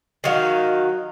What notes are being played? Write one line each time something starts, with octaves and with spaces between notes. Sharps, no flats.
D#3 F#3 F5